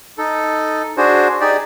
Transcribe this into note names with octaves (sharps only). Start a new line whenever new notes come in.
D#4 A4
D4 F#4 G#4 C5
D#4 G4 G#4 D5